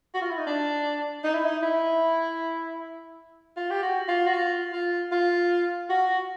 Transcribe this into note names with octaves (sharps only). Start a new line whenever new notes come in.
F#4
F4
E4
D#4
D4
D#4
E4
D#4
E4
F4
G4
F#4
F4
F#4
F4
F4
F4
F#4